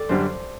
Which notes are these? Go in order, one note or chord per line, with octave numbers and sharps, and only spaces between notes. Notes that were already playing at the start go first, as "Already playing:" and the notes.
Already playing: G4 A4 D5
F#2 D3 G3 C5